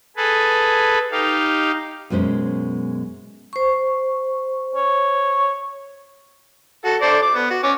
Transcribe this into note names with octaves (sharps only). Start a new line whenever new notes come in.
G#4 A4 B4
D#4 G4 F5
F#2 B2 G#3 C#4 C5
C5 C#6
C#5
F#4 A4
A4 C5 D5
D6
B3
F#4
C#4 D6